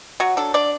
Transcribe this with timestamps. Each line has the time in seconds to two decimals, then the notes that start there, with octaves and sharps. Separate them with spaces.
0.20 F#3 F#4
0.37 D4 A4
0.54 D4 D5